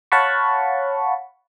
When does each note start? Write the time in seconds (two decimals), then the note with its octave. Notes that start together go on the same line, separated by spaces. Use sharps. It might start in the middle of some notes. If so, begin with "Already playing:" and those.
0.12 C#5 F5 F#5 A5 B5 C#6